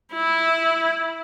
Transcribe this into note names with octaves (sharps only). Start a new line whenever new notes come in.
E4